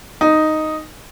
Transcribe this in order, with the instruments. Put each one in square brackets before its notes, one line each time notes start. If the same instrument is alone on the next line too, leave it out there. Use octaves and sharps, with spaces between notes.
[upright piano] D#4